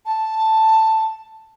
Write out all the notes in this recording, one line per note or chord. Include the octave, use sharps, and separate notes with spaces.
A5